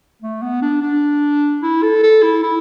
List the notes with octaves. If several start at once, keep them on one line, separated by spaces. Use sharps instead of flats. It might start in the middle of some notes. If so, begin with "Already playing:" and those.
A3
B3
D4
D4
E4
A4
A4
E4
E4